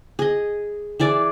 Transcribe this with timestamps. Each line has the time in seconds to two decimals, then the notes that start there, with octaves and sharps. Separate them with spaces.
0.19 G#4 D#5
1.00 E3 G#4 D5